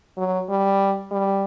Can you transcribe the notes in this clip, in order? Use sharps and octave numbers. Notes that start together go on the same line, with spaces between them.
F#3
G3
G3